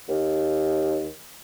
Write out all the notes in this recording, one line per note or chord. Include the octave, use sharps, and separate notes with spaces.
D#2